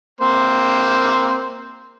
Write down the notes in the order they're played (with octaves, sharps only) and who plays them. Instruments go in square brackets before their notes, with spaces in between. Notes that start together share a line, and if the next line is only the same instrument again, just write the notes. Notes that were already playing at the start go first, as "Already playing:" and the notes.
[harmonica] A#3 C4 C5